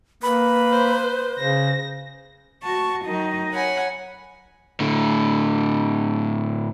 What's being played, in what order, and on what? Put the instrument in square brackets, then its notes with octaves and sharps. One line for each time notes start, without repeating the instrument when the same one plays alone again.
[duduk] A#3 [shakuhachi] B4 [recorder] B5
[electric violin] C5
[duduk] C#3 [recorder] C5 [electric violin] A#6
[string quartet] F#4 A5 C#6
D#3 F#3 D#4
C#5 F#5 G#5 B5
[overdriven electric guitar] A2 D3